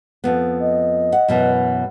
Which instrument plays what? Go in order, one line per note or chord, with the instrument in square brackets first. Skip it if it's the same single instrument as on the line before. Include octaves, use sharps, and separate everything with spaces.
[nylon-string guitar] F2 B3
[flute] D#5
[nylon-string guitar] F#5
F#2 B2 E3